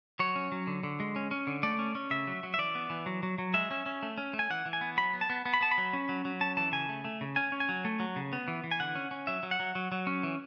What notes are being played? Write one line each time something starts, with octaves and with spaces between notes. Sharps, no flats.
F#3 C#5
C#4
F#3
D3
D3
G#3
C#4
C#4
D3
A3 D5
C#4
C#4
C#3 E5
F#3
F#3
E5
E3 D5
B3
E3
F#3
F#3
F#3
G#3 E5
C#4
C#4
A3
C#4
A3
G#5
E3 F#5
E3
G#5
B3
F#3 B5
B3
A5
B3
B3
B5
B3 A5
B5
F#3
C#4
F#3
F#3
C#4 A5
E3 A5
C#3 G#5
A3
A3
C#3
C#4 G#5
C#4
G#5
F#3
A3
F#3
C#3
B3
E3
E3
G#5
D3 F#5
C#4
C#4
F#3 E5
F#3
F#5
F#3
F#3
F#3
C#4
E3